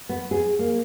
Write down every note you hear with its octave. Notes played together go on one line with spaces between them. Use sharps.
B3
G#4
A#3